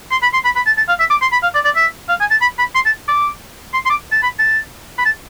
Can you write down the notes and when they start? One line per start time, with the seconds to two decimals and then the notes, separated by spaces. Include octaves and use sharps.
0.12 C6
0.23 B5
0.34 C6
0.45 B5
0.56 B5
0.67 A5
0.78 A5
0.89 F5
1.00 E5
1.11 D6
1.22 C6
1.32 B5
1.43 F5
1.55 D5
1.65 D5
1.76 E5
2.09 F5
2.20 G#5
2.31 A5
2.42 B5
2.59 B5
2.75 C6
2.86 A5
3.08 D6
3.74 C6
3.86 C6
3.90 D6
4.12 A5
4.23 B5
4.39 A5
4.98 B5
5.06 A5